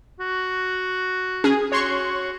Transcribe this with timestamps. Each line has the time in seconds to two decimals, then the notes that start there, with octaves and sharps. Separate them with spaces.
0.20 F#4
1.44 C#4 G#4
1.72 F#4 C#5 C6 C#6